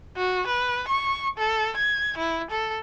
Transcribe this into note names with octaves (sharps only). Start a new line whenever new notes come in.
F#4
B4
C#6
A4
G#6
E4
A4